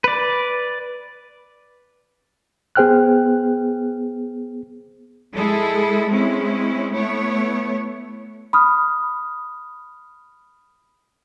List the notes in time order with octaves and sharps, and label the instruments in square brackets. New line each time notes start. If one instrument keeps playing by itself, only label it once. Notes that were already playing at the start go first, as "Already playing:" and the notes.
[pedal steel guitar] B4 D5
[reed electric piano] B3 G#4 C5 G5 F6 F#6
[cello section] G#3 E4 G#4 A4
G#3 C4 C#4 E4
A3 B3 E4 C#5
[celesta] B5 D#6 F6